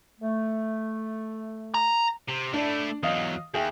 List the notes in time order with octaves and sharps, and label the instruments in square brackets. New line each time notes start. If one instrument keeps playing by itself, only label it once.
[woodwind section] A3
[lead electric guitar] A#5
[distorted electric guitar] C3
[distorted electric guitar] A3 E4 [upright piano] D4 D5
[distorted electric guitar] E2 F#3 [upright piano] D#5 F5 D#6
[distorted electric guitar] D#2 [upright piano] G#4 E5 G5